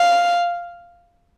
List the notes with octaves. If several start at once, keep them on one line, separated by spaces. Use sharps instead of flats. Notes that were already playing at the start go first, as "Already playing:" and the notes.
Already playing: F5